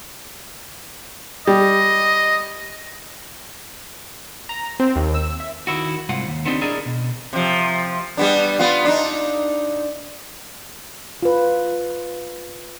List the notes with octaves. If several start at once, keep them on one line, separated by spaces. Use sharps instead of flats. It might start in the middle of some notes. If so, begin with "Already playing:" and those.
G3 D#5
A#5
C4
D#2
E6
E5
D#3 E4 F#4
C2 G#2 F4 F#5
D#2
B3 C4 D4 D#4 G4
D4 E4 G#4 A#4 D5 D#5
B2
C3 F3
G3 B3 D4
B3 F4
D4 D#4
F4 B4